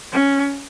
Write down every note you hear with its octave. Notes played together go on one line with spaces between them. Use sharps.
C#4